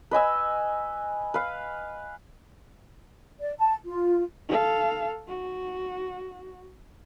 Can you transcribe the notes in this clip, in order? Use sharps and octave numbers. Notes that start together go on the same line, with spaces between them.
B4 D#5 G#5 E6
B4 F5
D5
A5
F4
A4 F5
F#4